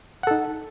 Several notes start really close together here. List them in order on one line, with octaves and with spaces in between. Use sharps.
F#5 A4 D#4